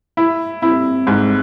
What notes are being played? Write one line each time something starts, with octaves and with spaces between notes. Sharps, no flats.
E4
C4 E4
G#2